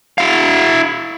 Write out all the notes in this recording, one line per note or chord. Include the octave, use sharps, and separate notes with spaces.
E4 F5